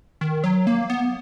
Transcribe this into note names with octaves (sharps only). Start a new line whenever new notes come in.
D#3
F#3
A#3
B3